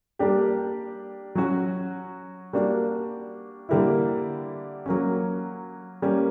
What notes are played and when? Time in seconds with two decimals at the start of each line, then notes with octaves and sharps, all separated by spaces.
0.19 G3 A#3 D4 G4
1.35 F#3 C#4 F#4
2.53 G3 A#3 D4 F#4
3.69 D3 G3 A#3 E4
4.86 F#3 A#3 C#4
6.02 G3 A#3 C#4